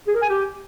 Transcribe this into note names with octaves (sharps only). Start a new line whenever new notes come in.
G#4
A#4
G#5
G4